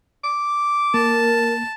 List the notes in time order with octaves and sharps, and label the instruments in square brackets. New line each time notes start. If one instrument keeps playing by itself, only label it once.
[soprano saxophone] D6
[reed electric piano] A#3 [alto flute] A#4 [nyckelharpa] A5